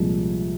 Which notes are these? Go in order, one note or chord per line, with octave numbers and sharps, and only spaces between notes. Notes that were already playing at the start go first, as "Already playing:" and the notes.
Already playing: C2 A#2 F3 G#3